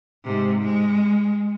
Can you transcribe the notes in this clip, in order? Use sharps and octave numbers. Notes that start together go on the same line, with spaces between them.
G#2 C3
G#3